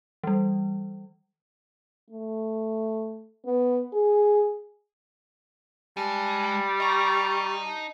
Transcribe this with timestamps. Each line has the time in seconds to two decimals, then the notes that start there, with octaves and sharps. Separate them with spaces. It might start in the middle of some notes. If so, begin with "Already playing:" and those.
0.24 E3 G3
2.10 A3
3.46 B3
3.93 G#4
5.97 G3 G#3 A5
6.80 D#5 A#5 C#6
7.65 A5